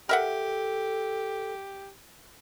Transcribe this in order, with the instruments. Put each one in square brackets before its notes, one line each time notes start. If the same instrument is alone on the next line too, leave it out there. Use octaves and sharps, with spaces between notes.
[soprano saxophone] G4 [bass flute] A4 [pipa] A#4 E5 F#5